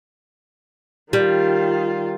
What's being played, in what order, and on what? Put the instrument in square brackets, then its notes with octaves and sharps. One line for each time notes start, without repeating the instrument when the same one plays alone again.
[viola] D#3 F4 [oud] G3